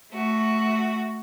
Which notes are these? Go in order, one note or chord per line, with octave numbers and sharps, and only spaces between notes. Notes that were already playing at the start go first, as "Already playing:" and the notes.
A3 F#4